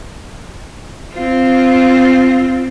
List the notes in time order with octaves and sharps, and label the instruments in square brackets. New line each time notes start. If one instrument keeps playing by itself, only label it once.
[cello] C4 F4